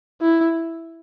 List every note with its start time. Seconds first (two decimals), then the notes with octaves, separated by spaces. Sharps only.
0.21 E4